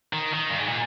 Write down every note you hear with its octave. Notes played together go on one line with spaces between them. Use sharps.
D#3
D#3
G2
G#2
A#2